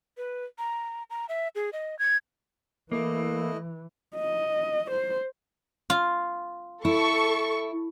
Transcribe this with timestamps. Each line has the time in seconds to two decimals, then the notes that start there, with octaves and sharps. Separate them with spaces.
0.17 B4
0.58 A#5
1.10 A#5
1.29 E5
1.55 G#4
1.73 D#5
1.99 G#6
2.92 E3 A3 A#3 E4 D#5
4.15 D#5
4.91 C5
5.90 F4
6.85 E4 A4 C#6